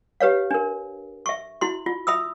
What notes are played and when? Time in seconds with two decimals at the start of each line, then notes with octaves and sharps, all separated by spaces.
0.20 G4 B4 C#5 F5
0.51 D4 A#4
1.26 E5 C#6
1.61 E4 F#4 C6
1.86 F4
2.07 E5 B5 D#6 E6